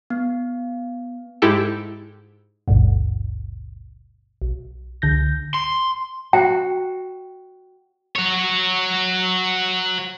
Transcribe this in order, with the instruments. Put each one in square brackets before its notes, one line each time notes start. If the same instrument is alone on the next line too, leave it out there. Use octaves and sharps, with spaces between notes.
[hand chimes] B3
[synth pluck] G#2 G#3 E4 G4 A4
[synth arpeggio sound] G#1 D2 G2 B2
B1
C#2 D3 G6 A#6
[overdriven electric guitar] C6
[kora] F#4 [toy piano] G5
[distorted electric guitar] F#4 C#5